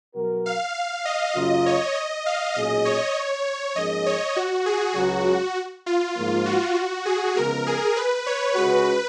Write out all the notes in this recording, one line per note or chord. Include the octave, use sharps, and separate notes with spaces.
B2 F#3 B3 F#4 A#4
F5
F5
D#5
F#2 C#3 F#3 A#3 F4
C#5
D#5
F5
B1 A#2 G#3 C#4 G#4 D#5
C#5
G#2 F3 A#3 C#4 G#4 D#5
C#5
F#4
G#4
C#2 C#3 F#3 F#4
F4
G#2 F3 A#3
F#4
G#4
C#3 F3 G#3 B3 A#4
G#4
B4
C#5
C#2 C#3 G#3 C#4 F#4 B4